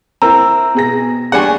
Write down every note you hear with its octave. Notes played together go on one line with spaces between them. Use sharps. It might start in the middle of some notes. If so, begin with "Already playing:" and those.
C4 E4 A#4 A#5 E6
B2 G#4 A#6
G3 D4 G#4 F#5 G#5 C#6